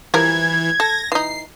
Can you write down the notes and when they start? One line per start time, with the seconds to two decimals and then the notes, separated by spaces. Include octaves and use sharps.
0.14 E3 F3 G3 A#4 G#6
0.80 A4 A#6
1.12 E3 D#4 C7